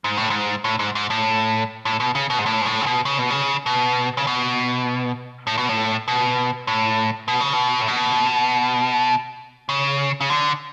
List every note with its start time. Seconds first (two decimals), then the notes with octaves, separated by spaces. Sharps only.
0.04 G#2
0.17 A2
0.30 G#2
0.64 A2
0.79 G#2
0.95 G#2
1.10 A2
1.85 A2
2.00 B2
2.15 C#3
2.30 B2
2.39 G#2
2.46 A2
2.62 G#2
2.66 A2
2.81 C#3
2.86 B2
3.05 C#3
3.18 B2
3.30 C#3
3.66 B2
4.17 C#3
4.27 B2
5.47 A2
5.58 B2
5.69 A2
6.08 B2
6.67 A2
7.28 B2
7.41 C#3
7.53 B2
7.81 A2
7.88 B2
9.69 C#3
10.21 C#3
10.30 D3